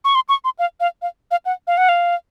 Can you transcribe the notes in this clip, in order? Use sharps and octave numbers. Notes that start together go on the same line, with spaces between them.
C#6
C6
C#6
C6
F5
F5
F5
F5
F#5
F5
F#5
F5